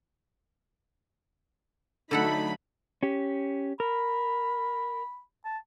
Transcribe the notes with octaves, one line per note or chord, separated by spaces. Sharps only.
D3 F#3 A3 D#4 A4 F#5 B5
C#4 G4
A#4 B5
A5